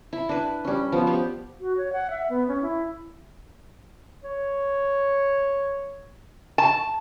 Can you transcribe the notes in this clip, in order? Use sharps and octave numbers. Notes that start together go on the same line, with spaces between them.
E4
D4 B4
G3 C#4
F3 B3
B3 G4
F#4
C#5
F#5
E5
B3
C#4
E4
C#5
A5